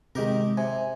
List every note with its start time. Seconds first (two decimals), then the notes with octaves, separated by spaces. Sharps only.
0.15 C3 D#3 G#3 G4 A#4
0.58 C3 G#5